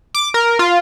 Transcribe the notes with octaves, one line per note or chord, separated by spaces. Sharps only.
D6
A#4
F4